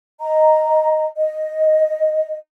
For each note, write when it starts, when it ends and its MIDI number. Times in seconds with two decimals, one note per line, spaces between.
0.20 1.05 75
0.20 1.05 82
1.16 2.34 75